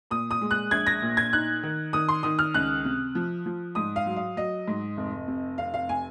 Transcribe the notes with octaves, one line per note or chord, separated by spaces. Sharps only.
A#2 D#6
D#6
G#3
F#6
A#1 G#6
A#6
A#2
G#6
D#4 F#6
D#3
D#3 D#6
C6
D#3 D#6
F6
C#2 F#6
C3
F3
F3
G#2 D#6
F5
F#3
F5
F#3 D#5
G#2
F1
C3
F1 F5
F5
C3 G#5